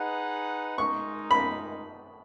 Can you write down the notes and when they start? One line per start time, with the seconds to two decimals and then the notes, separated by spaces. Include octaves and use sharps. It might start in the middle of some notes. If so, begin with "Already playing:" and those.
Already playing: D#4 G#4 B4 F#5
0.78 G#3 D#4 A#4 C#6
1.31 B5